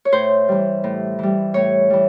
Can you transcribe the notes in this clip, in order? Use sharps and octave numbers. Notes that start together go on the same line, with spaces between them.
C#5
A2 C5
E3 G3
A2
E3 G3
A2 C#5
E3 G3